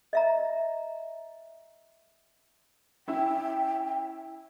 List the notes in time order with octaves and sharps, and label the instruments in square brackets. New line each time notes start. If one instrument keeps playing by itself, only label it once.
[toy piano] D#5 E5 A#5
[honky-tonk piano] C#4 E4 [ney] G5